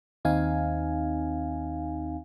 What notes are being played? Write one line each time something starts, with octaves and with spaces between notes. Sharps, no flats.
D#2 C4 D#4 F5 G#5